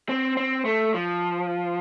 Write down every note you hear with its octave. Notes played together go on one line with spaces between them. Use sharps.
C4
C4
A3
F3